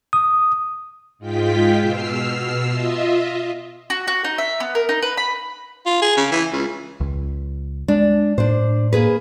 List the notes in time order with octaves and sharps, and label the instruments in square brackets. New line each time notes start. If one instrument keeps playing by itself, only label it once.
[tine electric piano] D#6
[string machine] G#2 G#3 F4 G5 B6
B2 E6 F6 C7
F4 D#5 E5
[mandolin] F#4
F#4
D#4
E5
B3
A#4
D#4
B4
B5
[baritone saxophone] F4
G#4
C#3
E3
C#2
[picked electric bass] C#2
[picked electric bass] G#3 [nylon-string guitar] D4
[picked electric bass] A2 [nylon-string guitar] D4 C5
[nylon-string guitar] A#3 G#4 B4